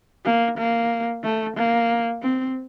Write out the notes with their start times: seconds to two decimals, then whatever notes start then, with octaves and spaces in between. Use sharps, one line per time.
0.25 A#3
0.57 A#3
1.23 A3
1.56 A#3
2.22 C4